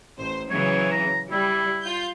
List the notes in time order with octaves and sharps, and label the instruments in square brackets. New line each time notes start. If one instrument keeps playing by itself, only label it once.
[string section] A1 C5
[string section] C#3 E3 F#3 [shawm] C#5
[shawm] A#5
[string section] G3 [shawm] E4
[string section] F4 G6